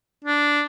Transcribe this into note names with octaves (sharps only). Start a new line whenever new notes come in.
D4